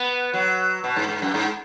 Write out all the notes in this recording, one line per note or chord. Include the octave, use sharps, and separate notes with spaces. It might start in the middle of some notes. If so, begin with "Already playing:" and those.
Already playing: B3
F#3
B2
G#2
G#2
F#2
G#2